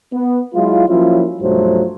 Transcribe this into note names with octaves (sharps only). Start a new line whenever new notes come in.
B3
F#3 G#3 E4 F4
F3 F#3 A#3 C#4 E4 F4
B1 G2 F3 F#3 A3 C5